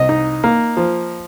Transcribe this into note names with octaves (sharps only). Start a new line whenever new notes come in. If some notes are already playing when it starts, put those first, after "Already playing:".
Already playing: C2 D#5
D#4
A#3
F3